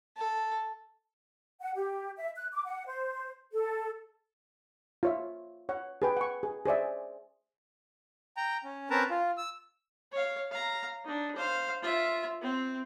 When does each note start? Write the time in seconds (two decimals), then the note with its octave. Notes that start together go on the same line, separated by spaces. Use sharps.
0.17 A4
1.61 F#5
1.75 G4
2.17 E5
2.36 F#6
2.52 D6
2.65 F#5
2.87 C5
3.53 A4
5.03 F4 C#5 E5
5.69 C#5 F#5
6.02 G#4 B4 G5
6.17 F#5 C#6
6.43 G#4
6.65 G#4 C5 D5 E5
8.37 G5 A#5
8.64 C#4
8.90 C4 C#4 A#4 B4 A5 A#5
9.10 F4
9.37 E6
10.12 C#5 F5
10.51 F5 A#5
11.05 D4 D#4
11.36 C5 F5
11.82 F4 E5
12.42 C4